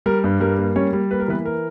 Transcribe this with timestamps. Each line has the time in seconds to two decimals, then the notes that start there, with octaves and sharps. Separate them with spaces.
0.06 G3 A#4
0.24 G2
0.40 G3 A#4
0.59 A#3
0.75 G3 C#4 C#5
0.93 G3
1.11 A#3 B4
1.20 A#4
1.28 E3 B3 B4
1.45 A#4